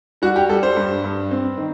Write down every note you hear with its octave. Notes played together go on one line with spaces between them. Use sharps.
G3 F#4
G4
G3 A4
C5
G2
G2
C4
D#3